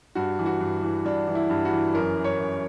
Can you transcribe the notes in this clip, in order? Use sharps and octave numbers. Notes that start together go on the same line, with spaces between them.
G2 F#4
E3
F#4
G2
E3
G2 D4
E3
E4
G2
F#4
E3
F#2 A#4
E3
C#5
F#2